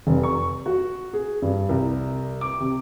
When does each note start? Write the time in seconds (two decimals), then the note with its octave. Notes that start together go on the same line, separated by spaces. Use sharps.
0.07 F1
0.23 C#6
0.66 F#4
1.13 G#4
1.42 G2
1.69 C2
2.41 D6
2.60 C3